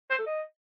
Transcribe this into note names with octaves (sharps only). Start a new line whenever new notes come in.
C5
A4
D#5